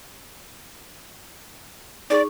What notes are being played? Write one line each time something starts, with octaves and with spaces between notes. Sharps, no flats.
D#4 G#4 D5 C#6